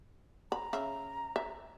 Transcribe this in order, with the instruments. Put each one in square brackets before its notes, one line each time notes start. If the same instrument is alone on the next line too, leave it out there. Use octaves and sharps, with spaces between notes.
[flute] A#5 [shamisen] B5
[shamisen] C#3 E5 B5
E5